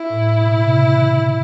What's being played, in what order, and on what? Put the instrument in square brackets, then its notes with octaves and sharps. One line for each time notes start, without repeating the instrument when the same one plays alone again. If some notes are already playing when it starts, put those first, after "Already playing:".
Already playing: [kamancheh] E4
[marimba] A2
B2
C3
C#3
D#3
D3